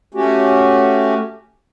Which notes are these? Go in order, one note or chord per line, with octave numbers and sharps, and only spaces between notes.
A3 C#4 F#4 G4